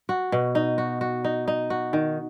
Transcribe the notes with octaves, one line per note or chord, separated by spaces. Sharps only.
F#4
B2
D#4
F#4
F#4
D#4
D#4
F#4
D#3